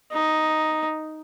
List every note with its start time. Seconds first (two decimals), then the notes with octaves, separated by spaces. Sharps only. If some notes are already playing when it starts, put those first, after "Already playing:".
0.12 D#4